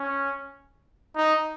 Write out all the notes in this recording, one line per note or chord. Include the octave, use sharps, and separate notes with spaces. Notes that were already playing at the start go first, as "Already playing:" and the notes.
Already playing: C#4
D#4